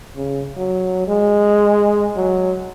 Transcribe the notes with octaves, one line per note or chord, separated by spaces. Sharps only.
C#3
F#3
G#3
F#3